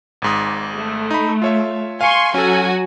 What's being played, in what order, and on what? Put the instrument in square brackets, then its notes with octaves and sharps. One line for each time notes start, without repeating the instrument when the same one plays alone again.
[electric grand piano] G#1 G#2 D#6
[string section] A3
[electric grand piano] D#4 B5
F4 C#5 E5
[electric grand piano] F5 C#7 [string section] G#5 C6 C#6
[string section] F#3 F#4 G#5 [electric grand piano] C#4 A4